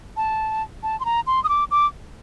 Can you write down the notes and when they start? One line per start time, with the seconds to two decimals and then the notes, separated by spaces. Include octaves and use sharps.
0.17 A5
0.83 A5
1.00 C6
1.05 A#5
1.27 C6
1.44 D#6
1.49 D6
1.71 D6